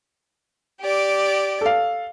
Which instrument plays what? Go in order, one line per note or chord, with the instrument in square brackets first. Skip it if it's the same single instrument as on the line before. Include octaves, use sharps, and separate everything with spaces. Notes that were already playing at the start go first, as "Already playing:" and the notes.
[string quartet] G4 D5
[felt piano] A4 F5